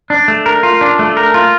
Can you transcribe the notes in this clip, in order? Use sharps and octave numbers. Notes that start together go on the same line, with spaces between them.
D4
A3
A#4
F4
D4
A3
A#4
F4